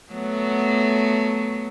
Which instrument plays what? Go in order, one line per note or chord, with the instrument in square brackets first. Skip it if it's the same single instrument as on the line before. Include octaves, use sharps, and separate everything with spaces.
[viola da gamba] F#3 A3 B3